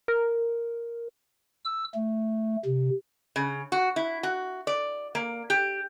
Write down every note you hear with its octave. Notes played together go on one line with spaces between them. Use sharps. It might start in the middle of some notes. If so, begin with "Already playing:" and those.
A#4
E6
A3
C3
C#3
F#4
E4
F#4
D5
A#3
G4